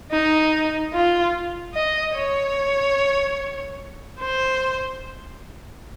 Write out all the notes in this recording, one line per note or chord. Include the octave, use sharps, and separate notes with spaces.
D#4
F4
D#5
C#5
C5